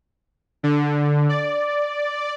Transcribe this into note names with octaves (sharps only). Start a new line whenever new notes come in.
D3
D5